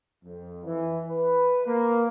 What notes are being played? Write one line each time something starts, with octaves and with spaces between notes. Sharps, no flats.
F2
E3
B4
A#3